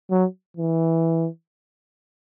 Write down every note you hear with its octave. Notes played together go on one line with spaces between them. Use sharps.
F#3
E3